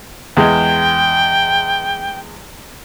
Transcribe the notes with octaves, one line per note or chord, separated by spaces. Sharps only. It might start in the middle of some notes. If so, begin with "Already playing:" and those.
E2 G#3 G5